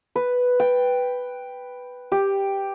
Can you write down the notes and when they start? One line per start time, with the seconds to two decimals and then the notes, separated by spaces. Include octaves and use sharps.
0.15 B4
0.60 G5
2.12 G4